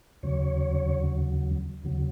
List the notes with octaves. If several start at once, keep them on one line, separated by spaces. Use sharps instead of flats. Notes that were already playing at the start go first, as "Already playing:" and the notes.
D#2 C#3 F#3 C#5
D#2 C#3 F#3